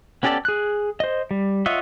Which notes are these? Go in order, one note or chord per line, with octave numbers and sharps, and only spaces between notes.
B3 C#4 G4 A4 D5
G#4 F#6
C5 D#5
G3
F4 C#5 D#5 E5 F#5